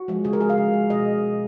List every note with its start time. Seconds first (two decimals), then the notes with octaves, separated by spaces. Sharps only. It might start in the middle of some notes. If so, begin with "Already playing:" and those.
Already playing: F#4
0.08 F3 G#3
0.25 C#3 G#4
0.33 A#4
0.41 G#3 G#4
0.50 F5
0.58 C#3
0.74 G#3
0.90 B2 D#5